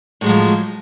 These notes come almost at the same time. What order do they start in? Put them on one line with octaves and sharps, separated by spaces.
A2 G#3 F#3 F3